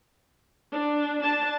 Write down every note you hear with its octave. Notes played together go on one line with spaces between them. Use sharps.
D4
D4 A5